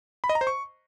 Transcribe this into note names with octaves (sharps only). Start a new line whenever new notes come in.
B5
D#5
A#5
C5
C#6